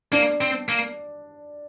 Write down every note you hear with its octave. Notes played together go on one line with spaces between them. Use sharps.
A#3 D4
C4
A#3